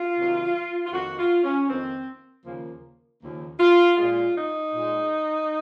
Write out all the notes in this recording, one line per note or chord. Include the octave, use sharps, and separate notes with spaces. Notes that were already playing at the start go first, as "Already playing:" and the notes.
Already playing: F4
C3 D#3 F#3 A#3
F4
F2 D#3 A#3 F#4
F4
C#4
F2 D#3 A#3 C4
D#2 C#3 F3 A#3
D#2 C#3 F3 A#3
F4
A#2 G#3 F4
D#4
A#2 G#3